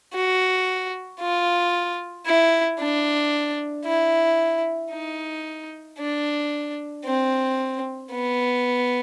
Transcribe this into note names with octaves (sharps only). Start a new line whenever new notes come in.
F#4
F4
E4
D4
E4
D#4
D4
C4
B3